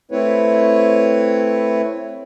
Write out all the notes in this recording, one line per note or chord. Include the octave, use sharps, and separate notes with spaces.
A3 C4 E4 B4 C#5